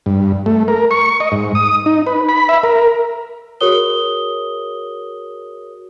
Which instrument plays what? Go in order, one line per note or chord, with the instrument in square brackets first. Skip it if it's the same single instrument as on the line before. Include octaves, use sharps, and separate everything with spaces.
[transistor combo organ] G2
A3
A#4
C#6
D#5
G#2
D#6
D#4
B4
B5
E5
A#4
[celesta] F#4 G#4 A#4 C#5 D#6 G7